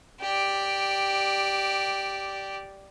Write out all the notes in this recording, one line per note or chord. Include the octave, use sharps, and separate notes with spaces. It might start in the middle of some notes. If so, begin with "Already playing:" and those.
G4 D5